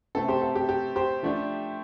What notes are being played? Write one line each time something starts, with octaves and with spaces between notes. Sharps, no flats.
C3 A3 C4 A4
G4 C5
A4
G4
G4
G4 C5
F3 A3 D4